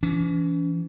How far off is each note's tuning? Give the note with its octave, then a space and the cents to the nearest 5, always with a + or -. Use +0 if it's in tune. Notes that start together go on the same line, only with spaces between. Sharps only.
E3 +35 C#4 +40